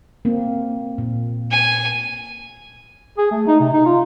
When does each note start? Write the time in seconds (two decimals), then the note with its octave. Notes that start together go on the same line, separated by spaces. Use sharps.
0.25 A#3 C4
0.98 A#2
1.51 G#5
3.18 G#4
3.31 A3
3.47 D#4
3.60 C3
3.73 D#4
3.86 F4